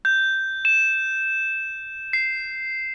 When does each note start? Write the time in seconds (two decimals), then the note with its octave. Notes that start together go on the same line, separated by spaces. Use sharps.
0.05 G6
0.65 E7
2.13 C7